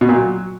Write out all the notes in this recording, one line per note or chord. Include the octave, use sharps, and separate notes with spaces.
B2
A#2
F#3